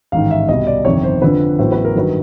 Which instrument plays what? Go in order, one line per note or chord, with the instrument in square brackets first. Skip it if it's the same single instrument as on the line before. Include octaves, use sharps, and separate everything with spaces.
[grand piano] A1 G#2 D#3 F5
E5
C2 B2 G3 D#5
D5
G1 F2 C3 D#3 C#5
C5
F2 D3 F3 B4
A1 A2 F#3 B3 C5
B4
A#4
G2 D#3 F#3 B4